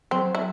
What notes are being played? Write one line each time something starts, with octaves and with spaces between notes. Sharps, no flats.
F#3 C4
E4